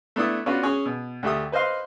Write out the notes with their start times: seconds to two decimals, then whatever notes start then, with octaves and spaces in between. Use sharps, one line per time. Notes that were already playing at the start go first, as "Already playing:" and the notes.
0.16 A3 B3 D4 E4 D#6
0.46 B3 C#4 D4 F4 F#4 B4
0.63 C#4 G#4
0.86 B2
1.23 D2 A3 G4 E5 D#6
1.52 B4 C5 D#5 F5 C6